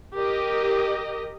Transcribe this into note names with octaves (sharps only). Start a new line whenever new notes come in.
G4 A#4 D#5